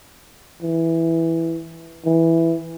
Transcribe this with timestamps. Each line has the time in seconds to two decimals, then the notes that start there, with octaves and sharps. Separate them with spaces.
0.62 E3
2.06 E3